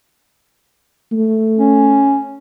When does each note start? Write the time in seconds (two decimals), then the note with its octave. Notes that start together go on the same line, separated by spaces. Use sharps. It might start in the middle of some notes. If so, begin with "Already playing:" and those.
1.12 A3
1.58 C#4